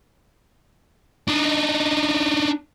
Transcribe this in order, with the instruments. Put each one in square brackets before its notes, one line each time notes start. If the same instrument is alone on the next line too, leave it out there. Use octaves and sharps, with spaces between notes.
[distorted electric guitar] D4 D#4